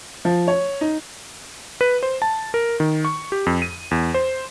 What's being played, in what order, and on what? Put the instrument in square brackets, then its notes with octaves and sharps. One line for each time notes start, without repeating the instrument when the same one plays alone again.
[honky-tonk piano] F3
C#5
D#4
[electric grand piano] B4
C5
A5
A#4
D#3
C#6
G4
F2
D#7
E2
C5